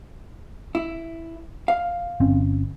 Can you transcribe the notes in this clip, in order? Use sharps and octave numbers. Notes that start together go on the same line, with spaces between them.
E4
F5
G1 C4 C#4